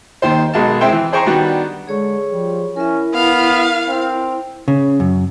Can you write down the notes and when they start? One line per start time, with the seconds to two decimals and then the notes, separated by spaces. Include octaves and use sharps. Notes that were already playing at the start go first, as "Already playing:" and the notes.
0.22 D#2 D#3 C5
0.54 B1 G#3 F#4 A#4 A5
0.81 G#3 C4 E4 E5 G5
0.92 E3
1.12 G#4 C5 G5 A#5 C#6
1.26 D#3 G3 B3 D4 F#4
1.87 D3 G#3 G#4 C#5 C#6
2.32 F3 G3
2.76 C#4 E4 A#4 E5
3.14 B3 F5
3.89 C4
4.68 C#3
5.00 F#2